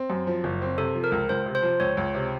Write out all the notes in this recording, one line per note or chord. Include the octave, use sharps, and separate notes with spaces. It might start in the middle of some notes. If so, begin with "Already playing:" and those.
Already playing: C4
F#2
F3
F#1
C4
C3 A4
F3
A#4
C#2
C#2 C5
C3
C5
F3
C#2 C#5
C#2
C3